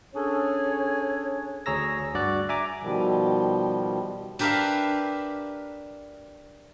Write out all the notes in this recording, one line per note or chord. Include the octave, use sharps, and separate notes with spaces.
C#4 D4 G#4 A4 C#5
D2 G#4 C#5 A#5 E6 A#6
G2 F#4 D5 F#6
E5 G#5 A#5 D6
B2 D#3 F3 G3
D4 G4 A#4 B4 E5 F5